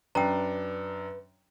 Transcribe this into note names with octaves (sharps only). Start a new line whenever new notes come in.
F#2 D4 B4 G5 A#5